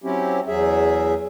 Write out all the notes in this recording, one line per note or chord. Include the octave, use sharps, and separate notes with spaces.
F#3 C4 C#4 E4 G4
E2 F#3 G#4 E5